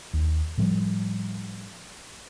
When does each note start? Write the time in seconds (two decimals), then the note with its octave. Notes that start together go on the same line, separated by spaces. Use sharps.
0.13 D#2
0.58 A2 F3 G3